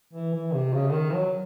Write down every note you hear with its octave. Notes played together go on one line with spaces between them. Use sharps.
E3
E3
C3
C#3
D#3
F#3